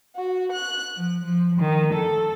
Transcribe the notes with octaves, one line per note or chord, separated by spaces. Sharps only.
F#4
F#6
F3
F3
D#3
A4